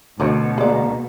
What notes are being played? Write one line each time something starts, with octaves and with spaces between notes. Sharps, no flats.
D2 B2 A3 D#4 C#5
G#3 A#3 D5